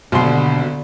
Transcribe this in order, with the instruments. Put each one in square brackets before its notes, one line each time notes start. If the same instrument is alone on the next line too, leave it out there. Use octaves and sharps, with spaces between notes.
[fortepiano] G#1 D#2 C6 [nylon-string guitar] B2 [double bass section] D3